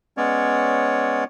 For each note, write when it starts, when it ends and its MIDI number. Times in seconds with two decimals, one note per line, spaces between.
0.17 1.24 56
0.17 1.24 59
0.17 1.24 61
0.17 1.24 73
0.17 1.24 74